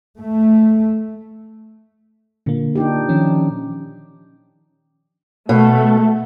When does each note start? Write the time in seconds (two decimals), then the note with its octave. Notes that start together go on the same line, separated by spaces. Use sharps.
0.18 A3
2.46 A#2 D3 A#3
2.75 D4 D#4 G4
3.09 D#3 F3 C#4
5.49 B2 A3